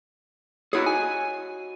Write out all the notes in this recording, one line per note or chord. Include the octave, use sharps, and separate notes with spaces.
D#4 E4 F#4 G#4 C#5
G#5